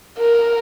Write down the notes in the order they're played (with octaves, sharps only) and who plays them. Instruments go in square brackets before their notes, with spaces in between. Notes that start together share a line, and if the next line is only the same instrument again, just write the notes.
[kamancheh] A#4